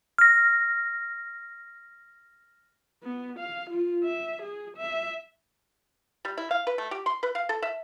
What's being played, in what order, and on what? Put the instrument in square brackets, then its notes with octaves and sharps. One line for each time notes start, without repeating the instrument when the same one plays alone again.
[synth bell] F6 A#6
[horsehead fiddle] B3
F5
F4
E5
G#4
E5
[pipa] G3
E4
F5
B4
A3
G4
C6
B4
F5
A4
E5